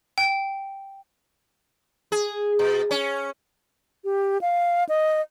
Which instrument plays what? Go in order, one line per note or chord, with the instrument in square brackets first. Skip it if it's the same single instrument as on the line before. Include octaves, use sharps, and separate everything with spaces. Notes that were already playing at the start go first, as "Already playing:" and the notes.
[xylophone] G5
[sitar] G#4
B2
C#4
[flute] G4
F5
D#5